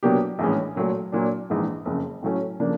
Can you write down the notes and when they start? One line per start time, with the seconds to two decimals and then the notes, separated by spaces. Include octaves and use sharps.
0.03 B2 F#3 A#3 D4 G4
0.39 A#1 A2 E3 G#3 C#4
0.76 A#2 F#3 A3
1.12 A#2 F#3 A#3 D4
1.50 A#1 G#2 E3
1.85 F#1 F2 C#3
2.23 A2 F#3 A3 C#4
2.60 C#3 F3 A#3 D4